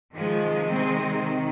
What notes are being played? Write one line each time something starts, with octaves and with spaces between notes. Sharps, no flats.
C3 D#3 F3 G#3
G#3 C4